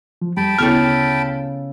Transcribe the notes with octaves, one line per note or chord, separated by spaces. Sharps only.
F3
F2 G3 G5 A5 B5
D2 C#3 B3 E4 A4 C#6 F6